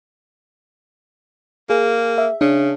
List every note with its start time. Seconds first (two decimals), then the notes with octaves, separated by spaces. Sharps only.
1.70 A#3 G#4
2.18 E5
2.41 C#3 D4